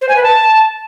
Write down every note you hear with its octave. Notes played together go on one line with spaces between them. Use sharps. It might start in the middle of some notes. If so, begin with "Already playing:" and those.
C5
G#5
B4
A5